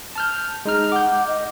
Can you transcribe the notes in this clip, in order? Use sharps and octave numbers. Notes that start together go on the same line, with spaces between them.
A5 F6 G6
G#3 D#4 F6
F#5 D6 G6
D#5